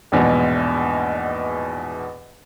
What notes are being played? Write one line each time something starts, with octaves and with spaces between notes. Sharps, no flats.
A#1 E2 G#2 B2